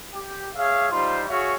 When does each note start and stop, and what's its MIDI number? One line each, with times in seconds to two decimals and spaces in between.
0.11 0.47 67
0.54 0.86 68
0.54 0.86 73
0.54 0.86 76
0.54 0.86 77
0.90 1.23 55
0.90 1.23 63
0.90 1.23 65
0.90 1.23 72
0.90 1.23 84
1.27 1.54 66
1.27 1.54 68
1.27 1.54 73
1.27 1.54 76
1.27 1.54 77